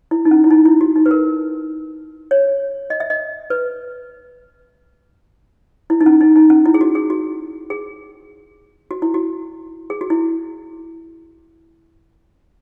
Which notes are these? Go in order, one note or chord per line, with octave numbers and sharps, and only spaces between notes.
E4
D#4
C#4
E4
D#4
E4
F#4
D#4
B4
A#4
C#5
D#5
E5
D#5
B4
E4
D#4
C#4
D#4
D#4
C#4
E4
G#4
F#4
G#4
F#4
G#4
F#4
E4
F#4
G#4
F#4
E4